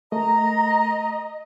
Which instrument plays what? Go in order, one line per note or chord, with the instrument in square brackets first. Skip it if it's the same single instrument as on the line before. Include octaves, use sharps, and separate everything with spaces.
[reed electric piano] A3 A#4 [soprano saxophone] D#5 [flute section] A#5